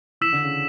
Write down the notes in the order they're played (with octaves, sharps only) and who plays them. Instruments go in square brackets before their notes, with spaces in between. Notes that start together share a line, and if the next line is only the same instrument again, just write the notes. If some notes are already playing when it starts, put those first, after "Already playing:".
[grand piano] E3 [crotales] E6 B6 E7
[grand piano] D3
C#3